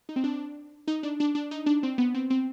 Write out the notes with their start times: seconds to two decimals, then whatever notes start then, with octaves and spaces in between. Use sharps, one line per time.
0.09 D#4
0.16 C4
0.24 D4
0.88 D#4
1.03 D4
1.20 D4
1.35 D4
1.51 D#4
1.66 D4
1.83 C4
1.98 B3
2.14 C4
2.30 C4